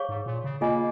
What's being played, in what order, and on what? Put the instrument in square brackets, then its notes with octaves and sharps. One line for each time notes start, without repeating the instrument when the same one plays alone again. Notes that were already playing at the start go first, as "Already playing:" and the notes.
Already playing: [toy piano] G#4 C#5 F5 C#6
[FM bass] G#2
A#2
C#3
[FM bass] A#3 [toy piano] F4 G#4 D#5 G#5